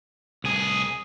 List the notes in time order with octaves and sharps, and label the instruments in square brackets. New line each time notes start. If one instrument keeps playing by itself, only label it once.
[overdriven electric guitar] C2 G#4